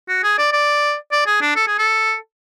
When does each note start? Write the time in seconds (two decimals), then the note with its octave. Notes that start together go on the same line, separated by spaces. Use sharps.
0.09 F#4
0.24 G#4
0.38 D5
0.53 D5
1.12 D5
1.27 G#4
1.42 D4
1.56 A4
1.67 G#4
1.79 A4